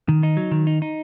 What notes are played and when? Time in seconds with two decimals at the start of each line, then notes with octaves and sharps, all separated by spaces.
0.09 D#3
0.23 D#4
0.37 F#3
0.51 D#3
0.67 D#4
0.82 D#4